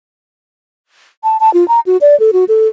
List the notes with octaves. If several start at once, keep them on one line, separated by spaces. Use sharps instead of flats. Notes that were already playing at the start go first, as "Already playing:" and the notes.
A5
A5
F4
A#5
F#4
D5
A4
F#4
A4